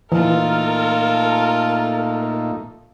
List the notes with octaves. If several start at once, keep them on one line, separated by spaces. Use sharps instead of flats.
A#2 E3 A3 D#4 F4 A4 A#4